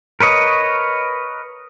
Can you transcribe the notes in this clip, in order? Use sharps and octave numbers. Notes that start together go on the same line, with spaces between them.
A#4 B4 C#5 D#5